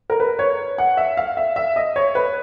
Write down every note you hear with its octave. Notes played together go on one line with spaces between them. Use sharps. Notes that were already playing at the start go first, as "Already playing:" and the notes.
A#4
B4
C#5
F#5
E5
F5
E5
E5
D#5
C#5
B4